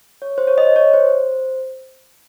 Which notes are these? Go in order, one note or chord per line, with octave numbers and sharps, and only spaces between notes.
C#5
C5
C#5
D#5
C#5
C5